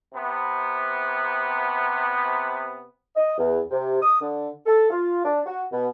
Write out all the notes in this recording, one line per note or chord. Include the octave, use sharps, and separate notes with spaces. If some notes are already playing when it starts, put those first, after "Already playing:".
C3 B3
D#5
E2
C3
D#6
D3
A4
F4
D4
F#4
B2